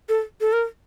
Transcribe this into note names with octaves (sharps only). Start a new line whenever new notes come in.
A4
A4
A#4